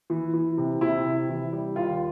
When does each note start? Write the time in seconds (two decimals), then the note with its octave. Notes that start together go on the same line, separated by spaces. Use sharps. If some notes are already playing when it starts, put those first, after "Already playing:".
0.10 E3
0.33 E3
0.57 C3
0.81 C3 E4
1.05 C3
1.29 E3
1.53 G3
1.76 D#2 F4